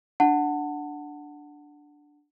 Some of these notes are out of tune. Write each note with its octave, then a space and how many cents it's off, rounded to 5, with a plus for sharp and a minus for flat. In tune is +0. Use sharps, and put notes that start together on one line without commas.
D4 +0 F#5 +0 A5 +25